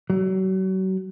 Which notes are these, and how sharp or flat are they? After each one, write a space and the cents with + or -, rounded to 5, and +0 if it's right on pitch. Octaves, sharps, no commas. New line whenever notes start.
F#3 +35